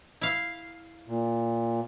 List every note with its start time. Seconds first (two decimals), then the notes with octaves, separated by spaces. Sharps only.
0.21 E4 F5
1.08 A#2